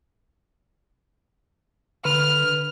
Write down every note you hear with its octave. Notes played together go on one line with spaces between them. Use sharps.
D3 B4 B5 F6